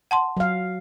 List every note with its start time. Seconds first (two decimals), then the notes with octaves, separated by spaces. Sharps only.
0.11 F#5 A5 C6
0.37 F#3 F5